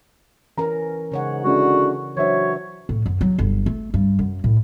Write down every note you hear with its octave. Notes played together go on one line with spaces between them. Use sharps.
E3 C#4 A#4 A#5
G#2 C#3 C#5 F#5
D3 G#3 C#4 E4 F#4
E3 F#3 D4 C5 C#5 E5
A2
F#2
F#3
G1
A3
G2
F#2
A2